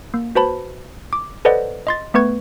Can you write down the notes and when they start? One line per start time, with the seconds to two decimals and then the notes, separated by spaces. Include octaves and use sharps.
0.14 A#3
0.35 F#4 B4 C5 A5 B5
1.13 D6
1.45 A4 B4 C5 D5 D#5 F#5
1.87 D#5 C6 A6
2.14 A3 B3 B4 C#6 G#6